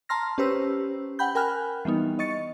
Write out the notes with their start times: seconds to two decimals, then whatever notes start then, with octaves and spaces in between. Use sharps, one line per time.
0.09 A5 A#5 C6 F6 A#6
0.38 C#4 G4 B4 C5 E6
1.19 F#5 G5 B5 G6
1.35 A#4 G5 G#5 B5 F6 F#6
1.85 E3 G3 B3 D#4
2.19 D#5 C#6 A6 C#7